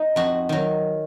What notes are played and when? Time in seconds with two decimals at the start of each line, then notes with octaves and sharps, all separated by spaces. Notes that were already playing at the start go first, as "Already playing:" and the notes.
Already playing: D#4
0.16 F2 F#4
0.49 D#3 F#3